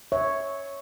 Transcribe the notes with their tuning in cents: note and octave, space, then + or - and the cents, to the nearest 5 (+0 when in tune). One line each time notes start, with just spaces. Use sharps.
C#5 +0 E5 -15